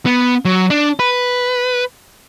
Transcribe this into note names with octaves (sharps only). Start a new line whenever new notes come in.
B3
F#3
D4
B4